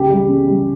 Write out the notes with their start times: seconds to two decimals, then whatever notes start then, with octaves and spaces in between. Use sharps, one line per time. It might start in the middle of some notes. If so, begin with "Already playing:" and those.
Already playing: C#2 C#3 G4
0.10 G3
0.28 C#3
0.47 G3